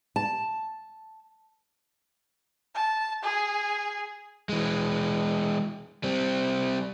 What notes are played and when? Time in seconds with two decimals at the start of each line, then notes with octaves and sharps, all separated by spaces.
0.16 A5
2.75 A5
3.23 G#4
4.49 E3 G#3
6.04 G3 C4